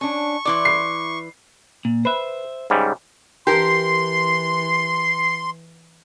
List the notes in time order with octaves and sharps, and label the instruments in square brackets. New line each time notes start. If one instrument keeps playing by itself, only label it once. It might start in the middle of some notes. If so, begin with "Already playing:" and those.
[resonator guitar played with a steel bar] C#4 D4 [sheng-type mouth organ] C#6
[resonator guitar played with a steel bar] E3 D5 [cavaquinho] E4 C6 D6
[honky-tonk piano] C7
[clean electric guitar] A#2
[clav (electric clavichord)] B4 [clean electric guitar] C5 E5
[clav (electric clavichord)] G#2 C#3 G3
[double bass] E3 [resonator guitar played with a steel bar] G4 A#4 [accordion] C6 [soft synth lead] C7